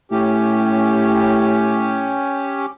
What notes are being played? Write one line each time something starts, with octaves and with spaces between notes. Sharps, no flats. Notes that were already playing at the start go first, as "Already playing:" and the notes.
A2 C#4 G4